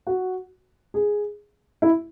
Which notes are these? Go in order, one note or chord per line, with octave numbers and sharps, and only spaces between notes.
F#4
G#4
E4